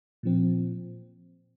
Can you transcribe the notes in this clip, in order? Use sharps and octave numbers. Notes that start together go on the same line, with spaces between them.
A#2 F3 C4